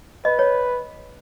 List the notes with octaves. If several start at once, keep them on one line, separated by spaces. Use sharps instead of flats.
B4 D#5
C#5